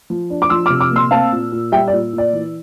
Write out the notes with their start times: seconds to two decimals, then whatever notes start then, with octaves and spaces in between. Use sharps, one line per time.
0.10 F3
0.30 D4
0.42 D6
0.49 F3 C6 E6
0.66 D6 F6
0.70 C3
0.81 D6 F6
0.91 A#3
0.96 C6 E6
1.11 C4 F5 A5
1.32 A#2
1.52 A#2
1.72 G3 E5 G5
1.88 D5
1.93 A#2
2.13 A#2
2.18 D5
2.33 E3